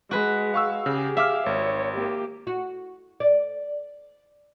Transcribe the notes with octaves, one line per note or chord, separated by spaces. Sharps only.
G#3 F#4 B4
F5 C#6 E6
C#3 G4 G#4
E5 F5 D6 F6
G#1 C#5
A#3 G4
F#4
D5